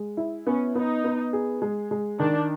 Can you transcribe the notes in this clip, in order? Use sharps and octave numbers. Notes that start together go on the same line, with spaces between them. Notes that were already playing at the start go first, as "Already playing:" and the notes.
Already playing: G#3
E4
B3 C#4
B3 D#4
B3
G#4
G#3
G#3
D#3 D4